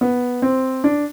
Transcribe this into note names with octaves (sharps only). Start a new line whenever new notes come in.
B3
C4
D4